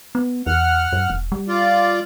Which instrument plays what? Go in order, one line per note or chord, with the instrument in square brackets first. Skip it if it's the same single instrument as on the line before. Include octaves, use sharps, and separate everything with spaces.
[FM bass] B3
[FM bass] E2 [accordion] F#5 F6
[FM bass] F#2
E1
G3
[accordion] F4 D5